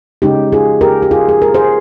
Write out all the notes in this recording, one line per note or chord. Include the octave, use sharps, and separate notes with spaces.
C#3 G#3 C#4 D#4 G4
F4 G#4
G4 A#4
G4
F4 G#4
G#4
A#4
G#4 C5